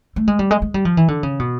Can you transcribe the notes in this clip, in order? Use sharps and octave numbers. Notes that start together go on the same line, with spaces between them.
A3
G#3
G3
G#3
G#3
G3
F3
E3
D3
C#3
B2